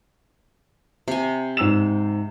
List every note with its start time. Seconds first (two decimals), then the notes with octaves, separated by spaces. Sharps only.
1.08 C3 G#5
1.57 G#2 E6 E7